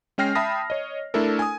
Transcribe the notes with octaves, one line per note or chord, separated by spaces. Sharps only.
G#3 C#4 G5 F6 A#6 C7
E5 G5 A5 B5 D#6 A#6
C#5 D#5
A3 D4 E4 A4 A#4
G#5 D#6